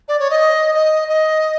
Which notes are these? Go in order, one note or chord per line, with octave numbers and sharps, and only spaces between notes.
D5
C#5
D#5
D#5
D#5